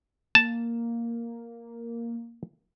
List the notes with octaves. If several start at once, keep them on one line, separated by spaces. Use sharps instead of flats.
A#3 A5